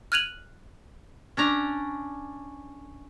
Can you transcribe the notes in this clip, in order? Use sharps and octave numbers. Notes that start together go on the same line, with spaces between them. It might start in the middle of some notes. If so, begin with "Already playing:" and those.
F6 F#6 G#6 D#7 F7 F#7
C#4 D4 A#5